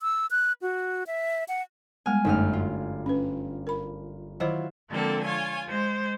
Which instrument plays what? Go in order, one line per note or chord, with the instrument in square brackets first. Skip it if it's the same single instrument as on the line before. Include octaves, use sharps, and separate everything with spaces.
[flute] E6
F#6
F#4
E5
F#5
[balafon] G3 G#3 B3 [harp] G#5 F6
[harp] G1 F#2 F6 [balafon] A3 D#4
[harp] F4
[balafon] C#4 B4
A#4 B5
[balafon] D#3 C5 D#5 [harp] F#3 E4 F4
[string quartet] D3 F3 G#3 A#3 C4 A4
F4 C#5 G#5
G#3 C5